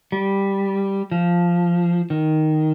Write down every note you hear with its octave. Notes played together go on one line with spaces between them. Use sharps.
G3
F3
D#3